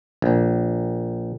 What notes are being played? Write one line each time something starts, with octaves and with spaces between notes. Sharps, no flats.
A#1